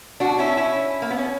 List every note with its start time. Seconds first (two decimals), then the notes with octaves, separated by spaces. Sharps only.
0.20 D4 F#4
0.39 C#4 E4
0.57 C#4 E4
1.02 A#3
1.11 B3
1.18 C#4